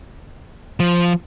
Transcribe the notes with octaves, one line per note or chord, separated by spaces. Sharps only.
F3